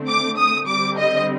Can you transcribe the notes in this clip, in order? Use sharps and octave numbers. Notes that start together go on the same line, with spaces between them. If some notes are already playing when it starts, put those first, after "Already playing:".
Already playing: D3 A3 C4
D6
D#6
D3 G3 C4 D6
D#5